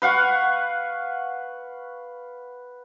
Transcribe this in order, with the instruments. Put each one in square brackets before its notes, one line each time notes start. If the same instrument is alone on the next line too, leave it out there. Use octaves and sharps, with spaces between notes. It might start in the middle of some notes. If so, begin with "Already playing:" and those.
[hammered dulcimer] B4 F5 F#5 C#6